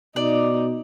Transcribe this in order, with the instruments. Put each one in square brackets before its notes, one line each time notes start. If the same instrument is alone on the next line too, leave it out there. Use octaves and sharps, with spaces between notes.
[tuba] B2 [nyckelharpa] D#4 [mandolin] D5